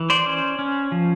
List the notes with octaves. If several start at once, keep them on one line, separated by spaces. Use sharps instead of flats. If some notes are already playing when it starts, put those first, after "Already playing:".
Already playing: E3
C5 D5
C#4
C#4
F3